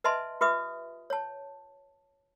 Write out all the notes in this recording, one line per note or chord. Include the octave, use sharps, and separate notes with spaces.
B4 D#5 E5 G#5 A5 C6
F4 G4 B4 E5 D#6
C#5 A5